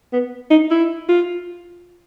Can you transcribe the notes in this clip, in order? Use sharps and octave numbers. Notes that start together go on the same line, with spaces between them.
B3
D#4
E4
F4